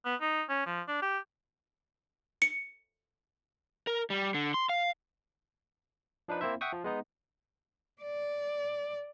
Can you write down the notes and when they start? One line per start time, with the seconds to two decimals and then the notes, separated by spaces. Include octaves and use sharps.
0.05 B3
0.20 D#4
0.49 C#4
0.66 F3
0.88 D4
1.02 G4
2.42 C#7
3.87 A#4
4.10 G3
4.34 D3
4.54 C6
4.69 F5
6.28 F3 D4 D#4 B4
6.41 A#3 C4 E4 C5 E5
6.61 E5 F#5 G5 C#6 D#6
6.72 F3
6.84 G#3 B3 D#4
8.02 D5